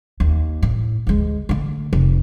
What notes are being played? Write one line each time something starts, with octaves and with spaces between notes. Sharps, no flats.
D#2
A2
D2 G#3
D3 A3
F1